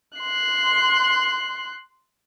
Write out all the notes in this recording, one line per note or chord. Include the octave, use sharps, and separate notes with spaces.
C6 F#6